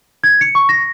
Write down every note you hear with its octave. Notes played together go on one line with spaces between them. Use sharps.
G#6
C#7
C#6
A#6